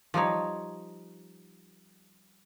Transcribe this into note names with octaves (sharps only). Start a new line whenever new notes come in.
F3 G3 D#4 C#5